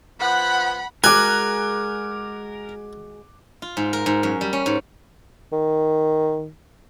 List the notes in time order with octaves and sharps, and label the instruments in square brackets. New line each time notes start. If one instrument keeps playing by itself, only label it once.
[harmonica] F3 B3 [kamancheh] F#5 B5
[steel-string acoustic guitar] G#3 F#4 G#4 [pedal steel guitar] A#4 [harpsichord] G#5 [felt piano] D6 F#6
[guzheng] F4
G#2
A#4
G#2
F#2
G3
C#4
G#2
[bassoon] D#3